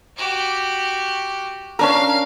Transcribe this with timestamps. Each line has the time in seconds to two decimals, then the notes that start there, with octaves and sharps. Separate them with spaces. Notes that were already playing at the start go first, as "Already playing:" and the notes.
0.17 F#4 G4
1.79 C#4 D4 A#4 F5